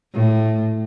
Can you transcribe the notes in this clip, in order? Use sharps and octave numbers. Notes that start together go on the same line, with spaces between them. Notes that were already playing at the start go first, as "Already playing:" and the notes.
A2